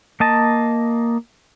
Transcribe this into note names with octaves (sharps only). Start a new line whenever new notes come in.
A#3 D#5 A5